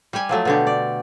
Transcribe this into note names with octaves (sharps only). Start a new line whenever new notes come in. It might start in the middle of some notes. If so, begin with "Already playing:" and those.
G3 G4 G5 G#5
F3 F#3 A3
B2 D3 G4
D5